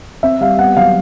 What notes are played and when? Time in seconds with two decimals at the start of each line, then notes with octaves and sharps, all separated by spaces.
0.23 C4 E5
0.41 G3 F5
0.58 B3 F#5
0.77 F#3 F5